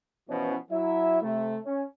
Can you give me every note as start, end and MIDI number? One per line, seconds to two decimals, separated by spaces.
0.29 0.55 47
0.29 0.55 52
0.29 0.55 53
0.29 0.55 61
0.70 1.20 54
0.70 1.20 64
0.70 1.20 76
1.22 1.57 48
1.22 1.57 57
1.65 1.84 61